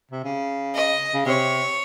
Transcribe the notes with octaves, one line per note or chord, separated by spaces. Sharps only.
C3
C#3
D#5
C#3
C3 C#5